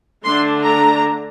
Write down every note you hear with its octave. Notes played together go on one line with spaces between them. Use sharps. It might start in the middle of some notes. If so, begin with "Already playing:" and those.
D3 A3 D4 C6
A#5